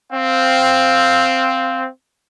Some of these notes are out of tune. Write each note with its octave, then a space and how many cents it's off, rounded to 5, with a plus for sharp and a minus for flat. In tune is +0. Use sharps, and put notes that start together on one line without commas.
C4 +0 F5 +0